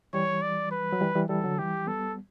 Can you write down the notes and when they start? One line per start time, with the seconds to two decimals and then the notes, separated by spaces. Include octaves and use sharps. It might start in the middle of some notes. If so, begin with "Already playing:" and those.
0.13 E3 G3 C#5
0.42 D5
0.71 B4
0.93 F#3
1.01 E3 G3
1.15 E3 G3
1.29 E3 G3 A4
1.44 D3 F#3
1.58 E3 G3 G4
1.87 G3 B3 A4